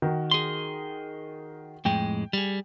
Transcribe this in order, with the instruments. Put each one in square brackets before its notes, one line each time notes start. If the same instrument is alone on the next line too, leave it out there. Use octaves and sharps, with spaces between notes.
[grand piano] D#3 F#4
[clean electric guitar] G#4 C6
[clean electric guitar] F2 A2 G#3 [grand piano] G5
[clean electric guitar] G3 G#4